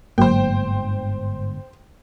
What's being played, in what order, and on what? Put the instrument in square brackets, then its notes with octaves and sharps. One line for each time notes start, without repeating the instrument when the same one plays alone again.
[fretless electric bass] G1 G#2 D3 [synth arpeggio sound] F#3 A#3 [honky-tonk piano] C5 G5